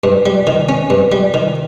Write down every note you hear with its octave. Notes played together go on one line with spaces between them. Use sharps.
G2
G3
D#3
C#4
G2
G3
D#3